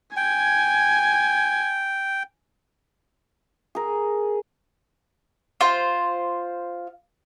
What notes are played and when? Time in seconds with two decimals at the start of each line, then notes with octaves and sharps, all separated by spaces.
0.17 G5 G#5 G#6
3.75 G#4 A#4
5.61 F4 C5